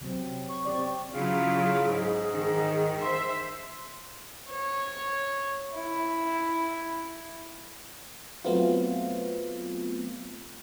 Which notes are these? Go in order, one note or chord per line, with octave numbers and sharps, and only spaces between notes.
C3 F#3 C4
C#6
C4 G4 D5
C#3 F#3 E4 F4 G#4
G#2
D#3
C5 E5 C6
C#5
E4
F#3 A3 B3 C4 F4